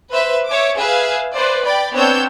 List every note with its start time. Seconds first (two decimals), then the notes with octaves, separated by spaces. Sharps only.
0.11 B4 C5 E5
0.47 C#5 E5 D6
0.78 G#4 B4 E5 F5
1.34 B4 C5 D5
1.64 D5 G5 B5
1.94 B3 C4 D4 C#5 E6 G6